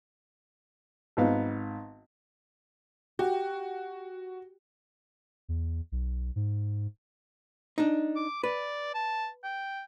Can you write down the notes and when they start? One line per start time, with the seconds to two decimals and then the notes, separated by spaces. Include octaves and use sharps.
1.17 G#1 G#2 B3 F5
3.19 F#4 G4
5.49 E2
5.92 B1
6.36 G#2
7.78 D4 D#4
8.16 D6
8.44 B4 D5
8.94 A5
9.44 G5